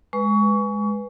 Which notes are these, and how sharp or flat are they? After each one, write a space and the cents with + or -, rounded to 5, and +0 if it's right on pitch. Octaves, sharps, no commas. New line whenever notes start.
G#3 +0 B4 +0 C#6 +25